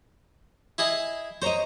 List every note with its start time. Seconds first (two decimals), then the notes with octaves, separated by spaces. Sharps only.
0.78 E4 G#4 D#5
1.42 C5 C#5 D#5 A#5